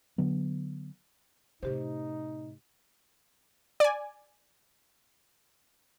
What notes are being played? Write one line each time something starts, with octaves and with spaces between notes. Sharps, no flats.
D3 F#3 B3
A2 C3 D#4 G4 C5
D5 G#5